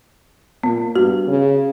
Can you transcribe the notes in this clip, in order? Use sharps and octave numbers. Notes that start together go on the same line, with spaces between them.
A#2 B3
G2 F#4
C#3